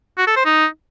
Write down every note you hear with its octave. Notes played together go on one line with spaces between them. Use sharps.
F#4
A4
C5
D#4